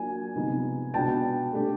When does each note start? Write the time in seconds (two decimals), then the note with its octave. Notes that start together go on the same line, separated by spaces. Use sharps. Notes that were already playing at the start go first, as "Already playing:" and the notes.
Already playing: F#3 A#3 D4 F4 G#5
0.36 C3 F3 G#3 B3 D#4
0.94 B2 G#3 B3 D4 F4 G5 A5
1.53 A3 D4 G4